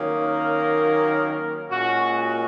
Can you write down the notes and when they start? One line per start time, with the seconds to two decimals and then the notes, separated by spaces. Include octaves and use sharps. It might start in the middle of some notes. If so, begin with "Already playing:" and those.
Already playing: D#3 F#3 A#3 C#4
0.24 A#4
1.71 A#2 G#3 C#4 F#4